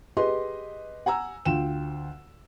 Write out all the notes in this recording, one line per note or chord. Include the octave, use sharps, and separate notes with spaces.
G4 G#4 B4 D#5 C6
F#5 G#5 A#5 E6
D2 F4 G5 E7